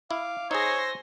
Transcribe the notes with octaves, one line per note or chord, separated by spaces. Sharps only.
E4 F5 D6
D#4 G#4 C5 C#5 G#5 C6 E6 A#6